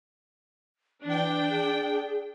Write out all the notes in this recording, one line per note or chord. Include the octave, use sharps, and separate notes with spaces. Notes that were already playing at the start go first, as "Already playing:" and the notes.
E3 D4 G5
G#4